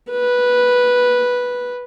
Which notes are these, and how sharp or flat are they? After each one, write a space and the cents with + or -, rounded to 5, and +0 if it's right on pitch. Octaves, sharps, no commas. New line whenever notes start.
B4 -5